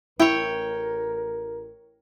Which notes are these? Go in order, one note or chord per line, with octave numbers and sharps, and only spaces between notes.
A1 E4 A#4 C#5 G5